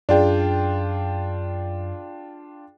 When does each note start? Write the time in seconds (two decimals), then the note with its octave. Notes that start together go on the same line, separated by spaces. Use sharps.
0.09 F#2 D4 F4 G#4 D5 G5